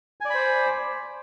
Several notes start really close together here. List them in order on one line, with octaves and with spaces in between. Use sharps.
G#5 D5 B5 C5